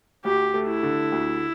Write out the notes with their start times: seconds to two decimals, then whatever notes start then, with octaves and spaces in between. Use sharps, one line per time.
0.24 D2 G4
0.54 A3
0.68 E4
0.83 D3
1.12 D2